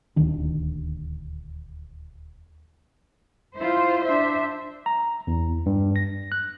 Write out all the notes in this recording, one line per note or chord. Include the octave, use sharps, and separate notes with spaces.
D#1 D2 D#3 D4
E4 F4 C5
D4 E5
A#5
E2
G2
A#6
F#6